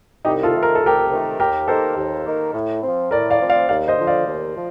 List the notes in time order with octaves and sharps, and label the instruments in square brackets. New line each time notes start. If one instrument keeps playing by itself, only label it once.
[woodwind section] C2 [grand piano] D#4 G4
[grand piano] F4 A4
[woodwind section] C3 D#3 A3
[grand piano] A#4
A4
[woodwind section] C2 [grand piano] G4 A#4
[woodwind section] C3 D#3 A3
[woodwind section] D#2 [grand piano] G4 A#4
[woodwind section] D#3 A#3 D#4 A#4 [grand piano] A4 C5
[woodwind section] D#2
D#3 A#3 D#4 A#4
A2
C4
F3
[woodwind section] A2 [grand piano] A#4 D5
[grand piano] D5 F5
[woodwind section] F3 C4
[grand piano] D5 F5
[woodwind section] D#2 [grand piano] D5 F5
[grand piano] C5 D#5
[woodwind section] D3 F3
[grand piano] D5 F5
[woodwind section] D#2
F3